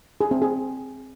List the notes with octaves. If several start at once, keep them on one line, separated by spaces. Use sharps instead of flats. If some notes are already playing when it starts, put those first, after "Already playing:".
G#4
C4
G#4